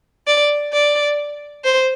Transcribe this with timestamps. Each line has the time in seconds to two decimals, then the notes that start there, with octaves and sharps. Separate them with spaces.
0.27 D5
0.73 D5
1.64 C5